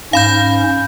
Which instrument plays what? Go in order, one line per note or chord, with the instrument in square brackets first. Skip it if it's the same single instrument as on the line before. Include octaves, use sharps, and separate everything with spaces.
[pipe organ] G#2 C#4 [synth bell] F5 B5 G6